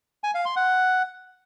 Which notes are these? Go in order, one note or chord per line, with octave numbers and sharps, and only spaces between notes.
G#5
F5
C6
F#5